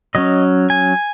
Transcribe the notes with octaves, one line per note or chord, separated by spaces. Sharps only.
F#3 C#4 D#5
G#5